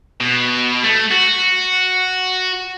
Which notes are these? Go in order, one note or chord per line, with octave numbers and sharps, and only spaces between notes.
B2
A3
F#4